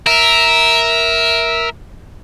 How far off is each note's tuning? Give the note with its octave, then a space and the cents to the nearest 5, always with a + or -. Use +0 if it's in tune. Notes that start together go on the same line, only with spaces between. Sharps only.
A#4 +5 E5 -10